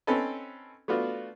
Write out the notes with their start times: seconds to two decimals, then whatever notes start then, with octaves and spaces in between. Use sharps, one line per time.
0.07 C4 C#4 D#4 A4 B4
0.88 A3 B3 D4 F4 F#4